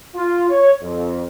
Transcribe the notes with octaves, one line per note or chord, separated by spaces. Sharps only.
F4
C#5
F2